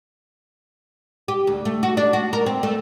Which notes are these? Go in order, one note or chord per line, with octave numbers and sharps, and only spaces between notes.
G4
D2
A3
F#4
D4
F#4
A#4
C4
A3